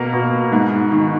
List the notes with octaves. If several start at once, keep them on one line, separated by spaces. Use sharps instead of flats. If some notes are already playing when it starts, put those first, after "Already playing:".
Already playing: B2 A#3
B2
G#2
D#3